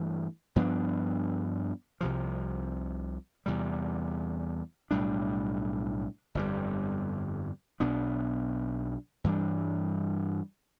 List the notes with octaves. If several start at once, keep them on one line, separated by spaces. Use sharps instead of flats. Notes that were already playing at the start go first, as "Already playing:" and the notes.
Already playing: G2 E3 A3
G2 F3 B3 D4
C2 C3 F3
E2 C3 G3
B1 A2 G3 D4
G1 F2 C3 G3
B1 B2 B3 D4
G2 E3 G3 D4